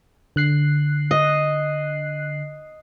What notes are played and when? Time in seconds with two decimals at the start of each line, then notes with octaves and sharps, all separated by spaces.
0.36 D3 F#6 C7
1.11 D#5